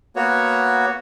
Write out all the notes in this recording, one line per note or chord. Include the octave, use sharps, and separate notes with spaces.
A#3 B3 F#4 C#5